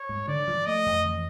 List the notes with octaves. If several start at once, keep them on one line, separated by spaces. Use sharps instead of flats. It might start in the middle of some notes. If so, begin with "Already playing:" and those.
Already playing: C#5
G#2
D3 D5
F3
A3 D#5
F2
E3